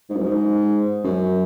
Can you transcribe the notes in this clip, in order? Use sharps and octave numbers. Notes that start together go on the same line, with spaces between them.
G#2
F#2
G#2
F#2